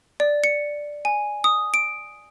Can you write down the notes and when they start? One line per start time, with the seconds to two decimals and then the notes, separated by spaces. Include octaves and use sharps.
0.20 D5
0.44 C#7
1.05 G#5
1.44 D#6
1.74 D7